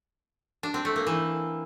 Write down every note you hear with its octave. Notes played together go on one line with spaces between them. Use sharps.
D4
C4
A3
A#3
E3